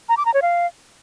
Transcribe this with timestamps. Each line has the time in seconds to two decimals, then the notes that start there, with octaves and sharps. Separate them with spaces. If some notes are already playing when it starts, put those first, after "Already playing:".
0.09 A#5
0.17 D6
0.26 A#5
0.34 C#5
0.42 F5